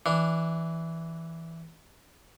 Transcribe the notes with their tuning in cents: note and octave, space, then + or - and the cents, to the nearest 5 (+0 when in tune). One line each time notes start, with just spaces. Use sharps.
E3 +0 D4 +0